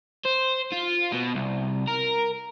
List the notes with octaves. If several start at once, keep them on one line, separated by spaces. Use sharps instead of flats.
C5
F4
B2
C2
A#4